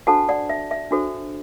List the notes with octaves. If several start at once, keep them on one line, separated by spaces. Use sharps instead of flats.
D4 F#4 A4 C5 F#5 A5
D5 F#5
E5
E5
D4 F#4 A4 C5